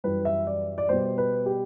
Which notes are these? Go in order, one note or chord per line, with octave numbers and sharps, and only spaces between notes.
F#2 E3 G3 B4
E5
D5
D5
B2 G3 C5
B4
G4